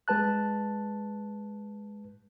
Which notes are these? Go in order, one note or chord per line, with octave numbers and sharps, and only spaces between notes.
G#3 B4 A5 F#6